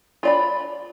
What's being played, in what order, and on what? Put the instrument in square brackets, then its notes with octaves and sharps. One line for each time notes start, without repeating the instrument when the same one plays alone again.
[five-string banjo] F4 D5 B5